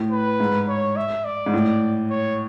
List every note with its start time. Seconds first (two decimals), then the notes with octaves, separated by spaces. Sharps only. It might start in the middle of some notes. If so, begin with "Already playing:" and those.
Already playing: A2
0.11 B4
0.40 G#2
0.68 C#5
0.96 E5
1.25 D5
1.46 G#2
1.54 A2
2.10 C#5